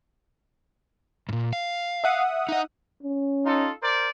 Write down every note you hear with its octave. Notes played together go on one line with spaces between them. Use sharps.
G2 A#2
F5
E5 F#5 D#6
D#4 D#5
C#4
D#4 F4 A4
A#4 C5 D5